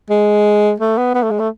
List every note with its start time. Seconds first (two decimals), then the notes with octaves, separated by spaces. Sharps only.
0.10 G#3
0.80 A3
0.97 B3
1.14 B3
1.22 A3
1.31 G#3
1.39 A3